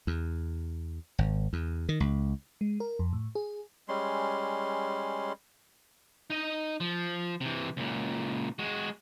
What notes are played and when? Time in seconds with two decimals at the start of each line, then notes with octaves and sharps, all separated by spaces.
0.07 E2
1.18 G#1
1.53 E2
1.89 D#3
2.00 C#2
2.61 G#3
2.80 A#4
2.99 F2
3.13 A2
3.35 G#4
3.88 G3 G#3 C#4 C6
6.30 D#4 D#5
6.80 F3
7.41 C3 E3
7.77 C#2 A#2
8.59 G#3 F#4